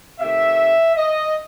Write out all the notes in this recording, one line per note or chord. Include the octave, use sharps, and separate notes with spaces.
C3 D#3 A3 E5
D#5